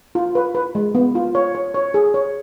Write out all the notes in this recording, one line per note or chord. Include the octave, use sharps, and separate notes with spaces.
F4
B4
B4
G#3
B3
F4
C#5
C#5
C#5
G#4
C#5